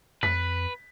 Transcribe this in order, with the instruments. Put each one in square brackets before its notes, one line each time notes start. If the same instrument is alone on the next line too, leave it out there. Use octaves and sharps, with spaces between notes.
[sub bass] F2 [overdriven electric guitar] B4 [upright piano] B6